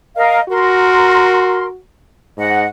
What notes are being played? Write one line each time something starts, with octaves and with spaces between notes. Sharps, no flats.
A#4 D#5 F5
F#4 A#4 C6
G#2 D#5 F#5